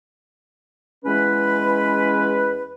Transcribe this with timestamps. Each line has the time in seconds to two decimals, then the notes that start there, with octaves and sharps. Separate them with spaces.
1.05 E2 G#3 C#4 B4